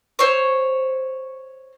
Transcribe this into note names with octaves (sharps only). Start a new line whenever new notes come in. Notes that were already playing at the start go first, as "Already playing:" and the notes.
C5 C#5